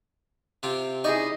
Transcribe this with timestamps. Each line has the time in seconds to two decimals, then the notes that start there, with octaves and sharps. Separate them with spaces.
0.63 C3 C4 F4
1.04 D#4 E4 G#4 D5 D#5 C#6